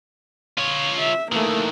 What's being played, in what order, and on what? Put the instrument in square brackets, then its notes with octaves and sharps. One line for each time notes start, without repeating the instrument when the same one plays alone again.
[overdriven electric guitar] F4 C#5
[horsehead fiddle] E5
[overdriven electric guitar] D#3 E3 [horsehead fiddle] A3 A#3